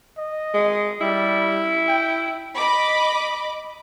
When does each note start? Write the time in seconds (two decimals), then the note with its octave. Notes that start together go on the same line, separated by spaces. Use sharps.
0.18 D#5
0.54 G#3
1.01 G3 E4
1.88 G5
2.56 D#5 B5 D6